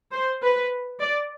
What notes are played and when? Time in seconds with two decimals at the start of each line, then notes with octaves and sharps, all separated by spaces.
0.14 C5
0.43 B4
1.00 D5